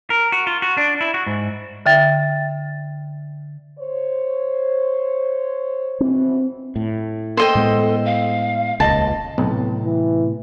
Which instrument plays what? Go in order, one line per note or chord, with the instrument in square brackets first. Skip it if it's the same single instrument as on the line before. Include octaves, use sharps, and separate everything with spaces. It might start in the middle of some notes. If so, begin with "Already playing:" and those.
[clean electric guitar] A#4
F#4
F4
F#4
D4
E4
F#4
G#2
[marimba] D3 E5 G5 A6
[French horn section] C5 C#5
[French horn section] B2 E3 [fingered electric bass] C4
[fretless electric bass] A2
[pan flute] A4 [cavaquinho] C5 D#5 G5
[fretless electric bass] A2 G#3 B3
[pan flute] F5
[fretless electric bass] D#1 C#2 [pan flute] D#5 [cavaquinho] A5
[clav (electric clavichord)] B1 [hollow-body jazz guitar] A2 C3 B3
[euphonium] E3